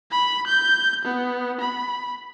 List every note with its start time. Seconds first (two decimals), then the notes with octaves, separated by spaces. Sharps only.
0.11 B5
0.47 G6
1.05 B3
1.60 B5